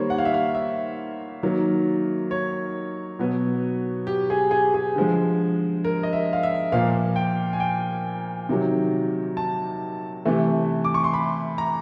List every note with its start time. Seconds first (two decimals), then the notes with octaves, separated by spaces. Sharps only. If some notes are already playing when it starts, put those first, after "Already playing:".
Already playing: D#3 G3 A#3 C5 C#5
0.10 F#5
0.18 F5
0.25 E5
0.34 F5
0.55 E5
1.43 D#3 F#3 A#3
2.31 C#5
3.19 B2 F#3 B3
4.07 G4
4.30 G#4
4.51 G#4
4.74 G#4
4.96 D3 F3 G#3
5.85 A#4
6.03 D#5
6.13 E5
6.33 F5
6.43 E5
6.72 A#2 F3 A#3 F5
7.16 G5
7.53 G#5
7.60 G5
8.49 C3 D#3 F#3
9.37 A5
10.25 C3 E3 A3
10.84 D6
10.94 C#6
11.04 C6
11.14 B5
11.58 A#5